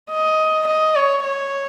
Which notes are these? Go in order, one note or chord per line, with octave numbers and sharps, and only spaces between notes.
D#5
D#5
C#5
C#5